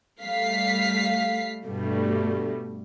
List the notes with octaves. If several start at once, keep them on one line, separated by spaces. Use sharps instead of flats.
G3 A3 F5 B6 C7
G2 B2 G3 A3